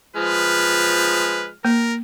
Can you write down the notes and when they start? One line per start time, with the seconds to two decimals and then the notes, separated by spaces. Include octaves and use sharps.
0.16 F3 G#3 B4 F6
1.65 A#3 A#4